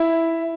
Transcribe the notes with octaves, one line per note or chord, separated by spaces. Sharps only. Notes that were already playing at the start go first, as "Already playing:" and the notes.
Already playing: E4